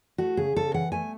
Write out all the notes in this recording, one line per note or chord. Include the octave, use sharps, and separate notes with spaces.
A3 F#4
C#3 G#4
C#3 A4
E3 F#5
A3 G#5